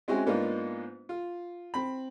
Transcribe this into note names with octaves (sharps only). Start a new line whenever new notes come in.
G#3 C4 C#4 E4 F#4 G#4
G#2 A#3 B3 D4 D#4 F4
F4
C4 B5